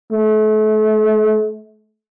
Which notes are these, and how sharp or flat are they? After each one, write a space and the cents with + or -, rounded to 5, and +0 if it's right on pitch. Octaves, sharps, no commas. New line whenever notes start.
A3 -35